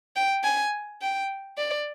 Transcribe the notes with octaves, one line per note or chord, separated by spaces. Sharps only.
G5
G#5
G5
D5